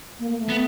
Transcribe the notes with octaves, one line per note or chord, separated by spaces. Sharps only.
A#3
A#3
A3
B3